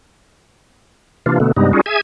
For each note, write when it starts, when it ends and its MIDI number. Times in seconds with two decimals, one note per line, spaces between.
1.26 1.39 48
1.26 1.39 52
1.26 1.39 58
1.26 1.39 62
1.26 1.39 65
1.40 1.52 47
1.40 1.52 50
1.40 1.52 57
1.40 1.52 59
1.56 1.73 43
1.56 1.73 48
1.56 1.73 55
1.56 1.73 56
1.56 1.73 59
1.56 1.73 63
1.73 1.81 55
1.73 1.81 61
1.73 1.81 63
1.73 1.81 65
1.73 1.81 66
1.73 1.81 68
1.86 2.01 68
1.86 2.01 76
1.86 2.01 80
1.86 2.01 92